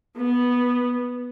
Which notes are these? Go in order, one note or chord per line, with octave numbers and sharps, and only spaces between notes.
B3